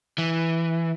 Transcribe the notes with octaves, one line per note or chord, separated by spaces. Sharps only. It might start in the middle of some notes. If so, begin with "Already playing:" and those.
E3